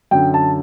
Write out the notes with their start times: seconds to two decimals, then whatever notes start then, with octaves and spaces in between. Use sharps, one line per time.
0.11 F#2 D3 G5
0.34 A5